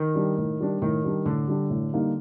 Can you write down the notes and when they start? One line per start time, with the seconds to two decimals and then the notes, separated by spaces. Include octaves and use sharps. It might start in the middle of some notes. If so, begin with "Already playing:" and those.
Already playing: D#3
0.15 G3 D4
0.37 A2
0.60 G3 D4
0.81 A2 D#3
1.04 G3 D4
1.25 A2 D3
1.47 G3 D4
1.70 A2
1.93 G3 A#3 D#4